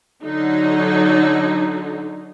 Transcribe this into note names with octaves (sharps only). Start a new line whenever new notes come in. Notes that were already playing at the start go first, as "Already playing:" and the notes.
D3 F#3 D#4